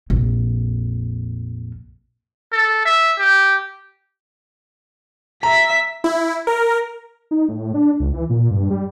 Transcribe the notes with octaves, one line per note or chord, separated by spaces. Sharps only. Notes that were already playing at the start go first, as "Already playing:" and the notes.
A#1 F2
A4
E5
G4
E5 A#5 B6
E4
A#4
D#4
A2
D4
C#2
E3
A#2
G2
G3